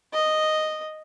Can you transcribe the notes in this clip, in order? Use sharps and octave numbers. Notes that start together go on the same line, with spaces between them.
D#5